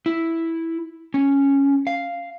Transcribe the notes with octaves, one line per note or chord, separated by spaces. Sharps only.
E4
C#4
F5